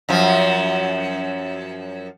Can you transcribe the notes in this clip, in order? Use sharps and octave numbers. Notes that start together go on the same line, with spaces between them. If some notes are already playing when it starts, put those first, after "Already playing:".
F#2 F3